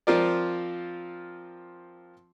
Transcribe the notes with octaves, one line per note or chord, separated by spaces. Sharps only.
F3 C4 F4 A#4 D5